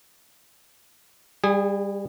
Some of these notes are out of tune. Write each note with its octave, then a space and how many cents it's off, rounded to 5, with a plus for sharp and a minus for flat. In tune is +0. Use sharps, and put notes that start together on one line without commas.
G3 +20 G#4 -25